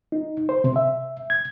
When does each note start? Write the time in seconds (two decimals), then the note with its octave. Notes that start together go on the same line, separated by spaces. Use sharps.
0.12 D#4
0.49 C5
0.64 C3
0.76 E5
1.30 G#6